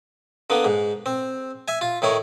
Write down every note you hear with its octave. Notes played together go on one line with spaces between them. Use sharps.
D3 A#3 B3
G#2
C4
E5 G#5
F4
A2 D#3 E4 C#5